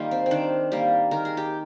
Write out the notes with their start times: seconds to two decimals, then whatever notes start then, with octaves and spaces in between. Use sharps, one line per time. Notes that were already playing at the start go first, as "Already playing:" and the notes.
Already playing: D#3 G3 A#3 D#4 F4
0.11 C4
0.26 C4
0.31 D#3 D4
0.72 G3 A#3
1.11 D#3 A#4
1.25 G#4
1.37 G4